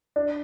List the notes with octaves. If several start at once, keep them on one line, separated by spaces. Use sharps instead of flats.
D4